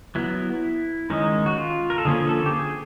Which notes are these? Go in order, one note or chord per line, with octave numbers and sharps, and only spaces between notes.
F#3 B3 E4
D#3 G#3 C#4 D#4
F#4
F4
A#4
A4
D3 F3 A#3 C#4 G#4
A4
G4
G#4